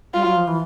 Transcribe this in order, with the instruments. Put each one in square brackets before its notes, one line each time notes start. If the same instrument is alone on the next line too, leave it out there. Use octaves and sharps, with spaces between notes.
[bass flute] G3 [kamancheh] F4
[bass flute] F#3
F3
E3